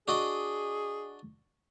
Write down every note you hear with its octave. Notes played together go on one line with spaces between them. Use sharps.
D4 F#4 G#4 D#5